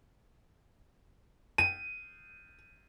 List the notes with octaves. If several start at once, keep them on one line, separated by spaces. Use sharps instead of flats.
D#7